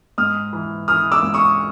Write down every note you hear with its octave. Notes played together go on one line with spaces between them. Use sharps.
G#2 D#6 F6
E3
E3 D#6 F6
D6 E6
G#2
C#6 D#6